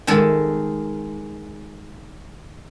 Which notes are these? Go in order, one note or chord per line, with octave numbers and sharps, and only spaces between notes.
D#3 G#3 A4